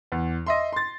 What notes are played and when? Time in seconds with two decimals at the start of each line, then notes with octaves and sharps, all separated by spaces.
0.12 E2
0.47 D#5 E5 C6
0.73 C6 A6